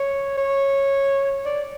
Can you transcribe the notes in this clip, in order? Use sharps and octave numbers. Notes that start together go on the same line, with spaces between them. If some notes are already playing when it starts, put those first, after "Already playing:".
Already playing: C#5
C#5
D5